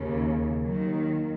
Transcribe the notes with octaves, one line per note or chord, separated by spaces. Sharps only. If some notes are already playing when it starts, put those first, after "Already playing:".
Already playing: D#2 C#3
D#2 D#3 F#3